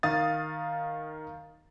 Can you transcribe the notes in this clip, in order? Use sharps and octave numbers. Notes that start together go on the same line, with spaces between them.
D#3 F5 D#6 A6